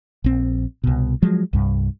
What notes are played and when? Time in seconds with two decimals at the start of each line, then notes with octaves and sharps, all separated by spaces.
0.24 A#1 C4
0.84 C2 B2
1.22 F3 F#3 G#3
1.53 C2 G2